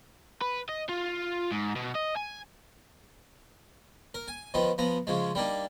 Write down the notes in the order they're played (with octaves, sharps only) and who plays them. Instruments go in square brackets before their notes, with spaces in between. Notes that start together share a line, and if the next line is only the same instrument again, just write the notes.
[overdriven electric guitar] B4
D#5
F4
G#2
B2
D#5
G#5
[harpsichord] A#4
G#5
D#3 F3 B3 D#4
F3 B3 A#5
C#3 F3 G#3
G3 A#3 D4 D#4